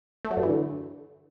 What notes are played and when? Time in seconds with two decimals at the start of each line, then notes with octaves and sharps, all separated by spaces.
0.25 A3
0.31 F#3
0.37 G2
0.43 E3
0.49 D3